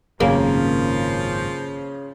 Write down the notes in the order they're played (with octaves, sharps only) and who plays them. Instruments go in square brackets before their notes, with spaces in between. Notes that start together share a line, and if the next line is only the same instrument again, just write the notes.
[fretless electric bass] G#1 F#2 F#3 [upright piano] C#3 C#4 [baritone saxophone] F3 [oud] A#3